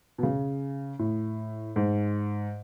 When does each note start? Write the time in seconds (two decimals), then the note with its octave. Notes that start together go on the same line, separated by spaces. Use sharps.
0.18 B2
0.23 C#3
0.99 A2
1.76 G#2